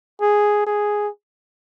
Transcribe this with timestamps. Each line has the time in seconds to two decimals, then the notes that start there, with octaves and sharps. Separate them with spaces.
0.21 G#4
0.67 G#4